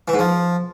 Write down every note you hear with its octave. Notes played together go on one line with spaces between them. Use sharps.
E3
G#2
F3